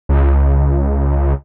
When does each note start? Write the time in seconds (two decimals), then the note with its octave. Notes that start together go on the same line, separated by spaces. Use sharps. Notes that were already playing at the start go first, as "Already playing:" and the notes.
0.09 C#2